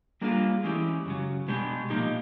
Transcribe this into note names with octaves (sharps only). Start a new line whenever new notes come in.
G3 A#3 D4 F4 G#4
E3 G#3 C#4 E4 G4
F#2 C#3 F#3
B2 G#3 B3 D4 G4
A#2 F3 A#3 D#4 G4